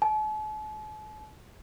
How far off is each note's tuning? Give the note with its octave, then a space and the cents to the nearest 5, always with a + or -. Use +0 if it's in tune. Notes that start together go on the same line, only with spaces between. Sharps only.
A5 -45